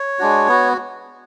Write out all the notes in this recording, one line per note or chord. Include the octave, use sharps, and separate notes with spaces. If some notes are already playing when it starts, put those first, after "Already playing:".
Already playing: C#5
G#3 D4 F#4
B3 F#4